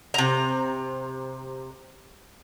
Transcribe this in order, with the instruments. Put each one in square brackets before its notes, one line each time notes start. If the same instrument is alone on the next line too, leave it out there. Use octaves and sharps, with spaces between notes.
[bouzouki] C3 A#5